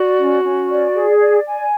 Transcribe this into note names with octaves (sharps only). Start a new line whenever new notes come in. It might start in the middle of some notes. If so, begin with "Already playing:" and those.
Already playing: F#4 D5
C#4
C#4
D5
G#4
D5
G#5